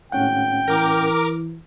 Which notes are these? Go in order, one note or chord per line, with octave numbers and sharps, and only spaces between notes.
G#1 A2 C#4 F#5 G5
E3 A#4 D6